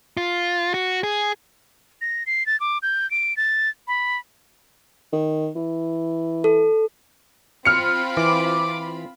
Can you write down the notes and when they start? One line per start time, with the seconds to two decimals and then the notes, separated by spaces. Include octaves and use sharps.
0.17 F4
0.74 F#4
1.03 G#4
2.01 A#6
2.26 C7
2.46 A6
2.60 D6
2.83 G6
3.11 D7
3.37 A6
3.87 B5
5.13 D#3
5.56 E3
6.44 A4
7.65 C4 F4 B5 F6 C#7
8.17 E3 D6